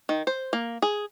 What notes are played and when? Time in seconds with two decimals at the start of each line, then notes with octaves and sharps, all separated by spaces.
0.09 D#3
0.27 C5
0.53 A#3
0.82 G#4